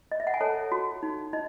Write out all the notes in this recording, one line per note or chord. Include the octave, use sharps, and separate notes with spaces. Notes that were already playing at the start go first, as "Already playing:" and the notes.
D#5
E5
F#5
G#5
A4 C#5 A5
F#4
D#4
D#4 D#5